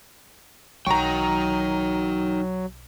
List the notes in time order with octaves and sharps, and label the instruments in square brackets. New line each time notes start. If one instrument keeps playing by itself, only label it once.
[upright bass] B1 [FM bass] F#3 [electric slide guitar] D#4 G5 [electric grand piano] A#5 C#6